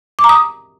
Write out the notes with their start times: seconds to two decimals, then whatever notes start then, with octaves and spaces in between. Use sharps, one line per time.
0.19 D6
0.24 A#5
0.29 D#6